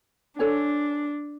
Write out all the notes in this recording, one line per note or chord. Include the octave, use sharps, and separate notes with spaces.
D4 A4 C#5 G#5